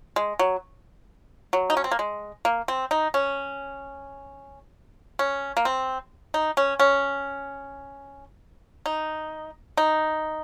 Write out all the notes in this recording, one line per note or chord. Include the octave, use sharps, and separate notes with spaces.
G#3
F#3
F#3
D#4
C#4
C4
A#3
G#3
A#3
C4
D#4
C#4
C#4
A#3
C4
D#4
C#4
C#4
D#4
D#4